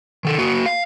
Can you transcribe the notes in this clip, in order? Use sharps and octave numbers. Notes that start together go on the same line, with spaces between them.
D#3 A4
A#3 F#4
F5